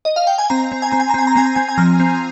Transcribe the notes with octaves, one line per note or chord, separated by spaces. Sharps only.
D#5
F5
G5
G#5
C4 A#5
C4
G#5
C4 A#5
G#5
A#5
C4 G#5
A#5
C4 G#5
A#5
C4 G#5
G#5
F3 A#5
C4